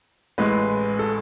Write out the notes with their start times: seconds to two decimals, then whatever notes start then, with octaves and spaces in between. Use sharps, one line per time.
0.38 A1 A2 G#3 B4
0.99 A4